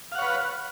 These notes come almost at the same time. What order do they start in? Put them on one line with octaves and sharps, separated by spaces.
F5 F#5 C#5 B4